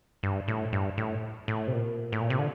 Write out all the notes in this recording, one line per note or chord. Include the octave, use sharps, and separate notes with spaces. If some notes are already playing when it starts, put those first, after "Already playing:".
G2
A2
G2
A2
A2
C3
A#2
A2
A#2
C3
D3